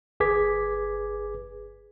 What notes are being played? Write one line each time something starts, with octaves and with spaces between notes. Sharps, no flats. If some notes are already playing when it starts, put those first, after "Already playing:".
G1 G#4 B4 D6 G#6 B6